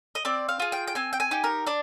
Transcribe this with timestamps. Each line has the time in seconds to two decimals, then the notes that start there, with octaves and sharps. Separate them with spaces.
0.15 D#5
0.25 C4 D5
0.49 F5
0.60 F4 G#4
0.72 G5
0.87 G5
0.95 C4 G#5
1.13 G5
1.20 G#5
1.31 D#4 G4
1.44 A#4
1.66 D4 D5